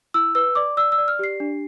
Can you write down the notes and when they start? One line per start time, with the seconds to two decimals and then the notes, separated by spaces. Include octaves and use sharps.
0.14 E4 E6
0.35 B4 E6
0.55 D5 D6
0.77 D5 E6
0.92 E6
0.98 D5
1.08 F6
1.19 G4 C7
1.40 D4